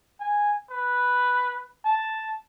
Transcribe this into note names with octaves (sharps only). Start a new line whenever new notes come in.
G#5
B4
A5